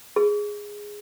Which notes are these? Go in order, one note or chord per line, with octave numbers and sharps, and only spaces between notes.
G#4